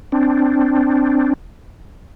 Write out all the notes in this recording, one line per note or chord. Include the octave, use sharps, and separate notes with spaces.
C4 D4